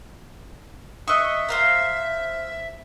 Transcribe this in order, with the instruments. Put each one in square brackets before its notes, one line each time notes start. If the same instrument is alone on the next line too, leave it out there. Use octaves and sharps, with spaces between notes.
[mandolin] D#5 C#6 [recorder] E5 [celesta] D#6 E6 F#6
[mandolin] C5 F5 A#5